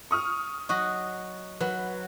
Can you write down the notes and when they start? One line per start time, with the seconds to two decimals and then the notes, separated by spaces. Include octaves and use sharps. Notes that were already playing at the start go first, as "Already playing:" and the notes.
0.11 C#6 D#6 F6
0.69 F#3 F#4 D#5
1.61 F#3 B4